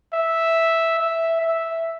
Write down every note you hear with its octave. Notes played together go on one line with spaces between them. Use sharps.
E5
E5
E5